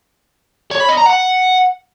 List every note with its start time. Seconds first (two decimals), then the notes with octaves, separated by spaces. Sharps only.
0.71 C#5
0.80 B5
0.89 D#5
0.97 A#5
1.06 F#5